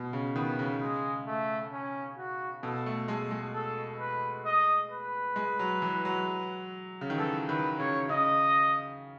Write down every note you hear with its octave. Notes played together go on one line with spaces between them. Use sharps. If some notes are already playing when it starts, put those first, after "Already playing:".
Already playing: B2
C#3
D#3 B3
C#3
G#3
A3
C#4
F#4
B2 A4
A3
G#3 A4
G#3
A4
B4
D#5
B4
G#3
F#3
E3
F#3
C#3
D#3
E3 A4
D#3 B4
C#3 C#5
C#3 D#5